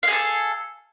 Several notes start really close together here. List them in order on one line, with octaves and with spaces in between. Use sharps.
F5 G#4 A4